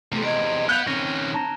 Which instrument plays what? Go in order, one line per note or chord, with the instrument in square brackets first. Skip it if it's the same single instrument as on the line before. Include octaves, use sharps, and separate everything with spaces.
[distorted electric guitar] E2 C3 [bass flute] A3
[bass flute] D#5 [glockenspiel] G#6 D7
[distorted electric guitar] B3 F#5 [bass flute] F5 [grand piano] F#6 G6 F7 [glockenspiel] G7
[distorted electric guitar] D#3 C#4 [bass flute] C4 [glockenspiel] A#6
[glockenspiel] A5 A#5 A#6